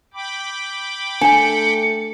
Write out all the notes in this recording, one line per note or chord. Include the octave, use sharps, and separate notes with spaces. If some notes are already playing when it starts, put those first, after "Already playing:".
G5 B5 D6
A3 D4 G#5 C#7